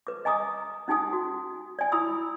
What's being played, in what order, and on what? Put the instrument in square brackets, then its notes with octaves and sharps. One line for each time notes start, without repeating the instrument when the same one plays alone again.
[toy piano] B4 D6
D#5 G#5 A#5 D6 D#6
C#4 D#4 G4 G#5 D#6
F#4
D5 G#5
E4 A#5 B5 D#6 E6